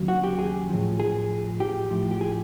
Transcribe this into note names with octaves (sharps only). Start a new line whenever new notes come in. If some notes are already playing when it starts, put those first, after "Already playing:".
Already playing: D#2 C#3 F#3
F#4
G4
G#4
A2 F3
G#4
G4
A2 F3
G4
G#4